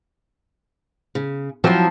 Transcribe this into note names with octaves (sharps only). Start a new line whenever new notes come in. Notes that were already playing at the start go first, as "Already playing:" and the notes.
C#3
F3 F#3 C4 E4